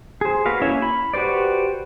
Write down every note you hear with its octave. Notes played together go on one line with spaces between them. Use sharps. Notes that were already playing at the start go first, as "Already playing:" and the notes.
G#4 C5
A#3 F#4 B4 F5
A#3 C#4 E4 C#5 E5
B5
F#4 G4 B4 C5 D5